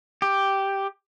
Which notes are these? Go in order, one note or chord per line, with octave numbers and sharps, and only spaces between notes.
G4